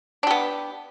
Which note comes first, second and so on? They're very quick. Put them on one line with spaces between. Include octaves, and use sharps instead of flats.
D4 G4 B3